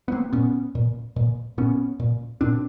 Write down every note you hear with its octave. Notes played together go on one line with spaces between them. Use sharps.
B3
A#3 C4
A#2 B3 C#4
A#2
A#2
A#2 B3 C#4
A#2
A#2 C4 D4